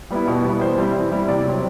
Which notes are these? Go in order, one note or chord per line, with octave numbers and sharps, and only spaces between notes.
G3 B3 E4
B2
G3 B3 E4
E3 C5
G3 C4 E4
E3
G3 C4 E4
C3 D5
F#3 C4